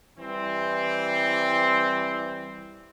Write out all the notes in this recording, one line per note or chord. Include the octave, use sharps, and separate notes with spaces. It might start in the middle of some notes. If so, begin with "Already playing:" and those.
E3 G3 C4